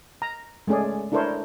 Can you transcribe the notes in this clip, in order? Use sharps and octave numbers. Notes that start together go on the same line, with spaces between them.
A#5
G#3 A3 C#4 G#4 D5
D4 E4 A4 A#4 C5 C#5